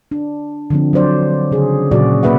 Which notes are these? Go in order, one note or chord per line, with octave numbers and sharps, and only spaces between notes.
D4
D3 F3 C4
F#3 D4 C5 D5
C#3 G#4
A#2 C#3 F#3 F#4 G#4 D5
C3 A#3 B4 E5 F#5